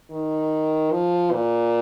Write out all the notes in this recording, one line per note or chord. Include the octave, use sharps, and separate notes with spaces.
D#3
F3
A#2